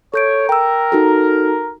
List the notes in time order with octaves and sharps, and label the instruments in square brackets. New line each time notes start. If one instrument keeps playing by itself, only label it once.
[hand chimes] A4 G6 D7 [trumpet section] C#5
[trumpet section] A#4 [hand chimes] G5 E6
[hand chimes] D#4 F#4 A4